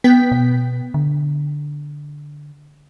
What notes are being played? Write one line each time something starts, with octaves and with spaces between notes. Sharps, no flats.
B3 G5 B6
B2
D3